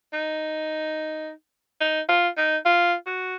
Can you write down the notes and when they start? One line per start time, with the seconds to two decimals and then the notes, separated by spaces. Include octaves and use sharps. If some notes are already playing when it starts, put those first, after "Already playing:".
0.13 D#4
1.81 D#4
2.09 F4
2.37 D#4
2.66 F4
3.07 F#4